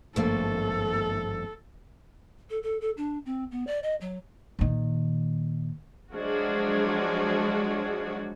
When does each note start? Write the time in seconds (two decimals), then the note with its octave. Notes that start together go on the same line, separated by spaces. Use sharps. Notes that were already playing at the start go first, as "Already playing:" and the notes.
0.16 G#1 G2 F3 A3 A#3 A4
2.50 A4
2.63 A4
2.81 A4
2.97 D4
3.26 C4
3.51 B3
3.67 D5
3.83 D#5
4.01 F#3
4.59 A#2 D#3
6.14 F3 F#3 G#3 D4 F#4 G#4